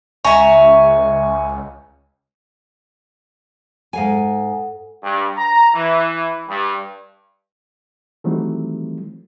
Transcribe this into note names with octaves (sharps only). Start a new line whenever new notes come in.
C#2 E5 G#5 A#5 C#6
G#2 A4 F5 F#5 G#5
G2
A#5
E3
G2
D#3 E3 F#3 G3 A3 C4